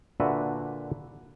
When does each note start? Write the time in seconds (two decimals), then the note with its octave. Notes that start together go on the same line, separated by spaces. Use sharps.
0.20 A#2 D3 D4 F#4 B4 E5